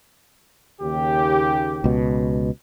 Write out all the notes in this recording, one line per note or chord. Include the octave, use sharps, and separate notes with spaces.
D#2 C#3 G4
C#2 B2